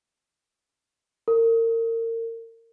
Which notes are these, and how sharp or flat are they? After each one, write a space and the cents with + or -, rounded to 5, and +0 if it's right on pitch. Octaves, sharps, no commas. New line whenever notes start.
A#4 -35